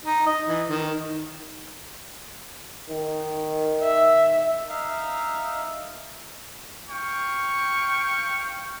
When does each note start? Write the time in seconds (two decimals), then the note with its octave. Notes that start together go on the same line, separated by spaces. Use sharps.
0.05 D#4
0.26 D#5
0.48 E3
0.69 D#3
2.90 D#3
3.83 E5
4.69 D#4 E5 F5
6.90 F5 G5 C#6